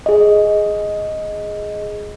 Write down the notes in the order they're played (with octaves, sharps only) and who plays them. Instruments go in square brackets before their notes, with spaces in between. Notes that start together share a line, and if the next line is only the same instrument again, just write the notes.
[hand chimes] G#4 D#5